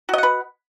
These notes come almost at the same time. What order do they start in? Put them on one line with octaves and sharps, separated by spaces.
F#4 D#5 F#5 B4